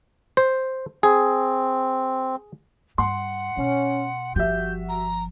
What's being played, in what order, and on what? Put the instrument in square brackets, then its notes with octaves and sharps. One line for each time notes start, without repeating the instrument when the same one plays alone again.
[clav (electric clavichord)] C5
[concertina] C4 [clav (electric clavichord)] G#4
[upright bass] G2 [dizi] F#5 [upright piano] C6
[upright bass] B2 [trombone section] C#4
[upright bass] G1 F3 [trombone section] F#4 [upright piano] G4 E5 [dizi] G6
[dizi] A#5